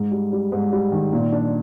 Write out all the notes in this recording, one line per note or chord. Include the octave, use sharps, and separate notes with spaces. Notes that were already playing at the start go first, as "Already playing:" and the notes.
Already playing: G#2
G3
G3
G#2
G3
D#3
A#2
D4